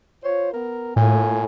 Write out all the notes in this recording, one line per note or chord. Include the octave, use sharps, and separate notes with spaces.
F4 C5 C#5
B3 A#4
A2 A#3 F4 G#5